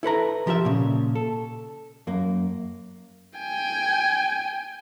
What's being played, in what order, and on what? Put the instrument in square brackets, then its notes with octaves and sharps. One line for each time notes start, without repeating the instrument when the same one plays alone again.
[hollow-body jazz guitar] E4 A4 B4 A#5
F3 G4 A#4 E5
A#2 C#3
A4
F#2 A#3
[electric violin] G5 G#5